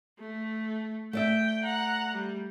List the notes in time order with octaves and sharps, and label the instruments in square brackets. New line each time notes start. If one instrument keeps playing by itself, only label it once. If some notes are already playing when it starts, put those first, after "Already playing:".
[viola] A3
[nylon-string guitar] A3 D5 E5 [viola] G5
[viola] F#5 A#5
G3